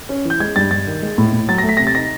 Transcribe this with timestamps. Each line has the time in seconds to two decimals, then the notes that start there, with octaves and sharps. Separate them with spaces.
0.09 C#4
0.25 E3 G6
0.40 G#3 G#6
0.56 G2 A6
0.71 G2 A6
0.87 D#3
1.02 G#3
1.18 A2
1.33 A2
1.48 F#3 A6
1.58 A3 A#6
1.69 B6
1.77 C3 A#6
1.87 A6
1.95 D#4 A#6